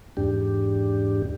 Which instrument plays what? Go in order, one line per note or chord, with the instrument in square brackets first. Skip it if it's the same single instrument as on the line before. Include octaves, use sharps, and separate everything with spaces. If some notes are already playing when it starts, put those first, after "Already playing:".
[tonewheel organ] E2 G#2 D4 G4